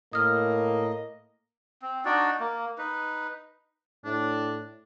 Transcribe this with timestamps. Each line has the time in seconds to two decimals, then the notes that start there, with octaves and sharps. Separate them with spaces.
0.13 A2 A#3 D#5 D#6 F6
1.82 C4
2.05 D4 D#4 F#4 D5
2.40 A#3
2.78 D#4 B4
4.05 A2 D4